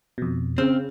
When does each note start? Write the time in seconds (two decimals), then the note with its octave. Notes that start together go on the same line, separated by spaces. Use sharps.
0.18 F2 B2
0.58 C#3 C4 F6